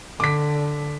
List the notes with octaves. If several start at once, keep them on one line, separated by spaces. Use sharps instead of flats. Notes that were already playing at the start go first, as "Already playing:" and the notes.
D3 D6 B6